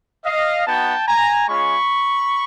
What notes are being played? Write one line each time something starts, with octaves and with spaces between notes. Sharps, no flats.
D#5 F5
B3 D#4 F#4 G5 A5
G#5 A#5
G#3 C#4 F4 B5 C#6